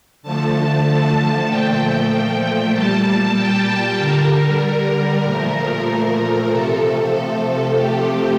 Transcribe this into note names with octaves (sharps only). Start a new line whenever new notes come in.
D3 F3 A3 A5
A#2 F3 A3 G5
A#2 G3 A5
G5
D3 G3 A#4
A#2 F3 A3
C3 F3 A3 A4
C3 F3 A3 G4